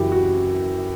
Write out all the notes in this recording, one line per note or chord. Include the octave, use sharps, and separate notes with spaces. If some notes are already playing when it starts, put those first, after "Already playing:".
Already playing: F#2 C#3 E3 E4 F#4 G4
F#4